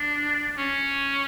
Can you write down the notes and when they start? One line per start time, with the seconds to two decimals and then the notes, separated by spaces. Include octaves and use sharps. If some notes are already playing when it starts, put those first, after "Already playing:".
Already playing: D4
0.57 C#4